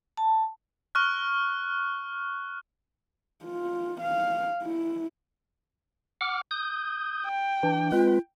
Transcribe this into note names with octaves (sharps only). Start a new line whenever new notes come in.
A5
C#6 F6 F#6
F4
F5
E4
F#5 D6 F6
D#6 G6
G5
E3 D4
G#3 C4 F4 B4